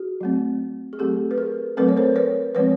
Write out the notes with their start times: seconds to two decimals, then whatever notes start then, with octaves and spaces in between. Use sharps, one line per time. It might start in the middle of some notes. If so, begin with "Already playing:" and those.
Already playing: F#4 G#4
0.21 F#3 A3 C4
0.93 G#4
0.99 F#3 A3 C4 G4 A4
1.31 B4
1.38 G#4 A#4
1.77 F#3 A3 C4 A4 B4
1.89 C#5
1.97 A#4 C5
2.16 B4 C#5
2.55 F3 G#3 C4 B4 C#5